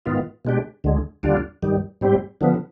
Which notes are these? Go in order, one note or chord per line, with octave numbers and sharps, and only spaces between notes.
G#2 D#3 B3 F4
B2 G#3 D4 G4
D2 D3 G#3
D#2 D3 G3 D4 F4
G2 D#3 G3
G#2 G3 C4 G4
D3 F3 B3